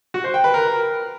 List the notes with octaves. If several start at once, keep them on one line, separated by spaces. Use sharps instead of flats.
F#4
C5
G5
B4
A#4